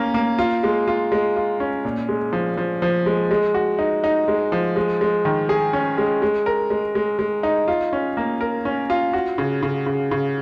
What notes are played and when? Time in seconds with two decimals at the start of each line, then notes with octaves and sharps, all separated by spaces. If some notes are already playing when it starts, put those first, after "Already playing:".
Already playing: A#3 C#4
0.14 A#3
0.39 F4
0.63 G#3
0.88 F4
1.12 G#3
1.36 F4
1.60 C#4
1.85 A#2
2.09 G#3
2.33 F3
2.57 F3
2.82 F3
3.06 G#3
3.31 G#3
3.54 F#4
3.79 D#4
4.04 D#4
4.28 G#3
4.52 F3
4.76 G#3
5.01 G#3
5.25 D#3
5.49 G#4
5.73 C#4
5.98 G#3
6.22 G#3
6.46 A#4
6.70 G#3
6.95 G#3
7.19 G#3
7.43 D#4
7.68 F4
7.93 C#4
8.17 A#3
8.41 A#4
8.65 C#4
8.90 F4
9.13 F#4
9.38 C#3
9.62 C#3
9.86 C#3
10.11 C#3